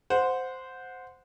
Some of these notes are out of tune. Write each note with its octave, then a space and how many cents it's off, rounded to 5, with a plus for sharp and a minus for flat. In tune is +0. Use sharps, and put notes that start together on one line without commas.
C5 -10 F#5 -20